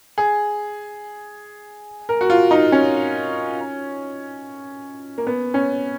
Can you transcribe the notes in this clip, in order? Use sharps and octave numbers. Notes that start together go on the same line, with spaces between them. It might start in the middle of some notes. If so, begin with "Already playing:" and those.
G#4
A#4
F#4
F4
D#4
C#4
A#3
B3
C#4